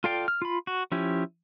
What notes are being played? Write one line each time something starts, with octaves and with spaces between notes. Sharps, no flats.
F4 A4 D5 F5 G5
F6
F4 B5
F#4
F3 C#4 E4 G4